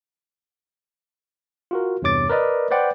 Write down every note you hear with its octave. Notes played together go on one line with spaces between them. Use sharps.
F4 F#4 A#4
E2 G2 C3 C#5 D6 A6
A#4 B4 D5 D#5
B4 C5 D5 F#5 G5